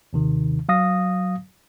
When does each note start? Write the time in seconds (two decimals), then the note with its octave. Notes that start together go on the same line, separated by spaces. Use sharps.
0.13 D#2 C3 D#3
0.69 F#3 F5 D#6 A#6